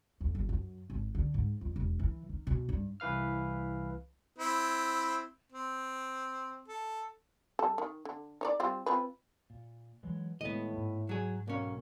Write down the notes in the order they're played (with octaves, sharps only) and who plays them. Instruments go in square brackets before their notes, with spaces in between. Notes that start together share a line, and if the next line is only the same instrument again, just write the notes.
[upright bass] F2
G1
F#2
G#1
D3
G#2
F2
E1
E3
D#3
B2
G2
[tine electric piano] C2 E3 B4 F5 F6
[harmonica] C4 E4
C4
A4
[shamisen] G3 A4
D#3
D3
D#4 C#5 D5
G3 C4 F4
C4 F4 B4
[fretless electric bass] A#2
E3 F#3 G#3
[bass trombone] A2 [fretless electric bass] D#3 G#3 [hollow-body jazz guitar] B3 D#5
[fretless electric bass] G#2
[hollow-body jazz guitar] F#3 G#4
[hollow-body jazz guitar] B1 C#4 [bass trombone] A#3